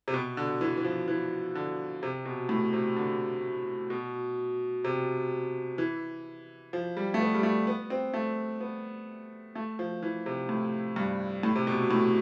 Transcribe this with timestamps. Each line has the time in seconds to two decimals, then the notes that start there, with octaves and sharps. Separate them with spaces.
0.08 C3
0.14 B2
0.37 D3
0.61 E3
0.77 E3
0.84 F3
1.08 E3
1.55 D3
2.03 C3
2.25 B2
2.49 A2
2.73 C3
2.96 D3
3.90 B2
4.84 C3
5.78 E3
6.73 F3
6.97 G3
7.14 A3
7.20 B3
7.35 G3
7.43 A3
7.67 B3
7.90 C4
8.14 A3
8.61 B3
9.55 A3
9.79 F3
10.03 E3
10.26 C3
10.49 A2
10.96 G2
11.43 A2
11.55 C3
11.67 B2
11.91 A2